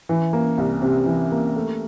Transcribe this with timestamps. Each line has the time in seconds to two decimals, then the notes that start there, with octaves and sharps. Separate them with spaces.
0.09 E3
0.33 A#3
0.58 C2
0.82 C3
1.06 E3
1.32 A#3
1.56 A3